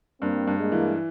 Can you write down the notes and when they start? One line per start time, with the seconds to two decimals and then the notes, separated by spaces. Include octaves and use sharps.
0.21 G2 A#3 C4
0.47 G2
0.59 G#3 A#3
0.72 E3